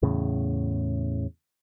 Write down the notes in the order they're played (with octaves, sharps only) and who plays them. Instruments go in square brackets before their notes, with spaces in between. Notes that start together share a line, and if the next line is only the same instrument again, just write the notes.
[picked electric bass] E2 A2 C#3